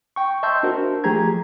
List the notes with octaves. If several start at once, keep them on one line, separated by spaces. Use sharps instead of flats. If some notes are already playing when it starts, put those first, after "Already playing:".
G5 C#6
D#5 E5 A5 C6 E6 G6
D4 F#4 A#4 C5
F3 A3 G4 G#4 A#5 G#6